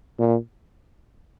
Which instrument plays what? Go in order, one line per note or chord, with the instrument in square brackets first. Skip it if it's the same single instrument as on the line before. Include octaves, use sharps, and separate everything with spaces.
[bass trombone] A#2